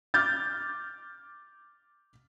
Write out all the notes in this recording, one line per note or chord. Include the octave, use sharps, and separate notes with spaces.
D6 F6 G6 A6